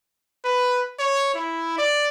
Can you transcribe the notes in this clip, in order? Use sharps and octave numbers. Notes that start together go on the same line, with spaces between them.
B4
C#5
E4
D5